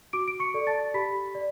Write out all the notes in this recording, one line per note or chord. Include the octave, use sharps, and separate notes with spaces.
F#4 D6 D7
D7
C#6 C#7
A4 D5
A5 A6
G4 B5 B6
D5